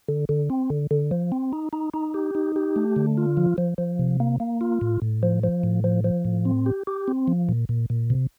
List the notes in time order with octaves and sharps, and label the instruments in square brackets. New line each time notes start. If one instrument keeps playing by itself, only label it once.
[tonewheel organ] D3
D3
C4
D3
D3
F3
C4
D#4
D#4
D#4
G4
D#4
G4
A3
D3
F4
F3
F3
F3
C3
A#3
A#3
F4
A2
A2
F3
F3
A2
F3
F3
A2
C4
G4
G4
C4
F3
A#2
A#2
A#2
C3